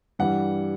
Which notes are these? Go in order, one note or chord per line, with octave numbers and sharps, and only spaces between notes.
G2 E3 G3 F#5